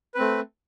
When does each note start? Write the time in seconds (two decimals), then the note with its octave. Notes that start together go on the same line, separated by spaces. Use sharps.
0.14 B4
0.17 C4
0.20 A3